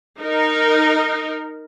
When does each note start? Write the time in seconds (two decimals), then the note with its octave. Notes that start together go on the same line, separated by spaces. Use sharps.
0.19 D#4 A#4